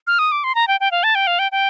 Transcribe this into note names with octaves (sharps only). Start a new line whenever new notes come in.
F6
D#6
D6
C6
A#5
G5
G5
F5
A5
G5
F5
G5
G5